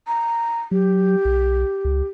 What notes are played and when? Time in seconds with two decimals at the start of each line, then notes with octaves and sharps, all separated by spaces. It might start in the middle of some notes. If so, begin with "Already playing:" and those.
0.07 A#5
0.71 F#3 G4
1.25 B1
1.85 C#2